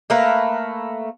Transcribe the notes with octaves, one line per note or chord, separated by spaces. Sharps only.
A3 A#3 A#4 B4